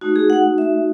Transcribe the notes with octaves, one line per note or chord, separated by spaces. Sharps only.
A3 D#4 F#4
G#4
F#5
E5